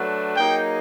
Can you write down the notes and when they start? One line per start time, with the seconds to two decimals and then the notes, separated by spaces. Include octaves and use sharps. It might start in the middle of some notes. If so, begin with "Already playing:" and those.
Already playing: F#3 A3 D4 F#4 B4
0.36 F#3 A#3 D#4 G#4 G5